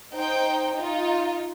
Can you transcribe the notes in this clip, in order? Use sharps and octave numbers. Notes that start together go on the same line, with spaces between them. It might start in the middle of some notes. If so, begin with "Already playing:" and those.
D#4 C5 G5
D#4 F4